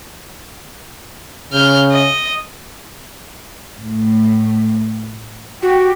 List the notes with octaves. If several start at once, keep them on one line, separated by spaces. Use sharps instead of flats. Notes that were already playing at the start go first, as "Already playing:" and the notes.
C#3 F6 G6
D#5
A2 A3
F#4 G4